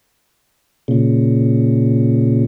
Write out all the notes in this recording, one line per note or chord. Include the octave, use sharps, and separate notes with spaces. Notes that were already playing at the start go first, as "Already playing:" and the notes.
A#2 C#3